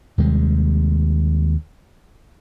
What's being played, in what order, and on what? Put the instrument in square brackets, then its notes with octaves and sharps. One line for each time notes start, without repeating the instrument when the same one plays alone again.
[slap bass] D#2 C3 G3 G#3